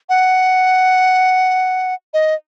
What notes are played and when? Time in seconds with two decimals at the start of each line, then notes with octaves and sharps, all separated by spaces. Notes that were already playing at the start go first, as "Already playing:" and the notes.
0.09 F#5
2.14 D#5